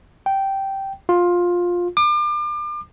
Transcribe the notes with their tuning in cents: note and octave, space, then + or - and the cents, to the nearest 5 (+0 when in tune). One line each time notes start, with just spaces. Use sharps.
G5 -10
F4 +15
D6 +35